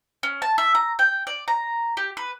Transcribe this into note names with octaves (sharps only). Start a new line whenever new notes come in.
C#4
A5
E5
A#5
G5
D5
A#5
G4
B4